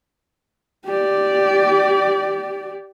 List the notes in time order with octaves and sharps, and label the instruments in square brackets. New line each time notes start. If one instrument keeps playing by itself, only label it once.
[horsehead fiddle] G4 D5